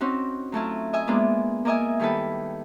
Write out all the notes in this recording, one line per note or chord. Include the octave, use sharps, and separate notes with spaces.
C4 C#4 D#4 F#4
F#3 A3 E4 F4
D#5 E5 G#5
G#3 A#3 B3 D4 F4
A#3 F4 A#4 D#5 E5 G#5
D#3 G3 E4 A4 B4